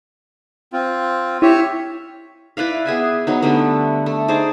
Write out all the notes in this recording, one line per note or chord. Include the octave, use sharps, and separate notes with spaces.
C4 F4
E4 G4 C#5 E5
E4 B4 D5 F5
B3 G#4 E5 G#5
F#3 B3 D#4
D3 G3 A3 B3
A3
D#4 G#4 C5 D5